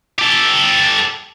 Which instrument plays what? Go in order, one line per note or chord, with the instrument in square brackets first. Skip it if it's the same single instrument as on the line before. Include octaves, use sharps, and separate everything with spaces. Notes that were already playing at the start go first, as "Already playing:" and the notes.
[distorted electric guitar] G4 A4